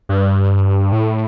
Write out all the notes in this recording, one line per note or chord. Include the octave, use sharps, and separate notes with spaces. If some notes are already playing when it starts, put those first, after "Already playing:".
G2
A2